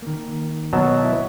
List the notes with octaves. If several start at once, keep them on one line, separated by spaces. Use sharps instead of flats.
D#3 A#3
B2 F#3 A5
E4